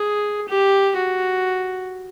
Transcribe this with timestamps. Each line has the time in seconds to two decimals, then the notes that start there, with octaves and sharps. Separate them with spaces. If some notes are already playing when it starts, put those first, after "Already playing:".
Already playing: G#4
0.48 G4
0.96 F#4